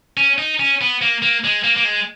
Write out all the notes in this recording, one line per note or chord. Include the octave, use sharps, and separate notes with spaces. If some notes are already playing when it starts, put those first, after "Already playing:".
C#4
D#4
C#4
B3
A#3
A#3
G#3
A#3
A#3
G#3